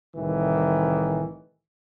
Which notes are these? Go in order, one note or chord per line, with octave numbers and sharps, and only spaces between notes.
C2 A2 D#3 E3